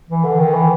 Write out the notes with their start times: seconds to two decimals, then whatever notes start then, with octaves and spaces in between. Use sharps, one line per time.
0.09 E3
0.24 D3
0.39 D#3
0.54 E3